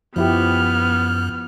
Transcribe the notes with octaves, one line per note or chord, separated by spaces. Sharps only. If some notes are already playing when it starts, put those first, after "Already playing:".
F#2 F3 B3 E4 G4 F6